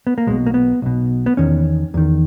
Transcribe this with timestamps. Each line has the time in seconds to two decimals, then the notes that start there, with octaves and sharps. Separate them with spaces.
0.07 B3
0.18 A#3
0.27 B1 B2 G#3
0.46 A#3
0.54 B3
0.82 B1 B2
1.26 B3
1.37 E2 D#3 C#4
1.94 E2 D#3